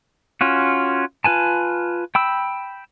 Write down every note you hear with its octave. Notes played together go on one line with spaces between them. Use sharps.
C#4 F4 F#4
F4 B4 G#5 A5
G5 B5 E6